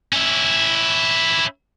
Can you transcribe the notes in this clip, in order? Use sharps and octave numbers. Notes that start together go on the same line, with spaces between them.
C#4 E4